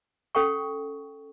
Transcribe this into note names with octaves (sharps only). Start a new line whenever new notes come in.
C#4 A4 F#5 G5 C#6